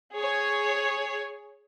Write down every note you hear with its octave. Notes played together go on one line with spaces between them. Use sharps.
G#4 C#5